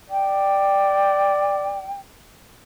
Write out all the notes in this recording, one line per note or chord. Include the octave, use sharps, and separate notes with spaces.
D5 G5